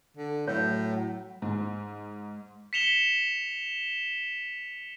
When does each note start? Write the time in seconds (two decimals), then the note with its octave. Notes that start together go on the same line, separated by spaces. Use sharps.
0.17 D3 A4
0.47 A2 F#3 C#5
1.42 G#2
2.73 B6 C#7 E7 F7 G7